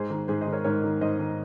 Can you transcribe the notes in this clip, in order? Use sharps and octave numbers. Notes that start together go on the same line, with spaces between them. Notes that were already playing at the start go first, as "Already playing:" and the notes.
Already playing: G#2 G#4 C5
D#3
G#2 G#4 C5
C5 D#5
D#3
A#4 C#5
G#2 A#4 C#5
D#3
G#2 C5 D#5
D#3